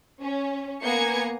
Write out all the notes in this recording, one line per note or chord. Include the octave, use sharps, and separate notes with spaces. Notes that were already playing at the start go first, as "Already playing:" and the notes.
C#4
A#3 B3 G#5 A#5 G#6 C#7